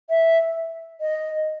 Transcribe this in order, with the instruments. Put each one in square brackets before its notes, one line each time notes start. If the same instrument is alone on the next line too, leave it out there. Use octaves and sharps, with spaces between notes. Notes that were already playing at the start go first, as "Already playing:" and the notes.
[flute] E5
D#5